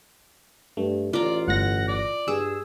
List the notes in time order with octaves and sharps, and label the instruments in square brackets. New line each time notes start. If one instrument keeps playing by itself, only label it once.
[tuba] G2 [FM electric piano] A3
[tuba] A1 [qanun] F4 A#5 [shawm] D5
[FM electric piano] G1 A2 A#6 [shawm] F#5
[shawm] D5
[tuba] G2 [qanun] G#4 [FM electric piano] E6